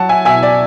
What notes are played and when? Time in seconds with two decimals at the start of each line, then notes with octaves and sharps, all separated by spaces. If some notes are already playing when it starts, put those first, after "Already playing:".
Already playing: F#3 F#5 A5
0.09 E5 G#5
0.25 B2 E5 G#5
0.43 D5